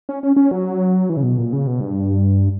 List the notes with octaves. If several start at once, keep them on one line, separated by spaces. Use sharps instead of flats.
C#4
C#4
C#4
F#3
E3
C#3
B2
A#2
C#3
B2
G2